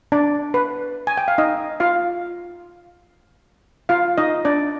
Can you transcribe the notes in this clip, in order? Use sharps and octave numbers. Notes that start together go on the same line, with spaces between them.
D4 D5
B4
G#5
G5
F5
D#4 D#5
F4 F5
F4 F5
D#4 D#5
D4 D5